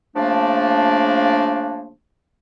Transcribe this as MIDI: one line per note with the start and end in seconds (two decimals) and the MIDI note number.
0.16 1.91 49
0.16 1.91 53
0.16 1.91 57
0.16 1.91 58
0.16 1.91 62